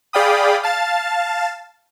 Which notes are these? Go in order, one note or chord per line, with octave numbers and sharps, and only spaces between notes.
G#4 D5 F5 G5 B5 D#6
F5 A5 A6